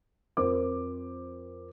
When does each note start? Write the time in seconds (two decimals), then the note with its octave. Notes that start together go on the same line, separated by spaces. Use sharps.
0.37 F2 A#4 C5 D6